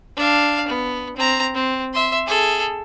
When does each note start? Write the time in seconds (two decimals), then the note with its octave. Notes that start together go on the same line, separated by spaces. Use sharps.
0.17 D4 F5
0.68 B3
1.17 C4 A#5
1.55 C4
1.93 E5 C6
2.27 G#4 A4